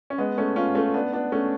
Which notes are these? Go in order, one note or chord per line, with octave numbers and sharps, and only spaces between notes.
C#4
G#3 B3
A3 C#4
C#4 F4
A3 C#4
B3 D4
B3 D4
A3 C#4